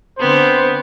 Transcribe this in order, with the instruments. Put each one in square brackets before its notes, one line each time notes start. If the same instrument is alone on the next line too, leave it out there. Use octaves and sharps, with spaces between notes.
[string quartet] D3 B3 C4 [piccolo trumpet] C5